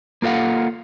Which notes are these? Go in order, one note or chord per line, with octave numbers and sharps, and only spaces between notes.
A#3 F4 A4 F5 F#5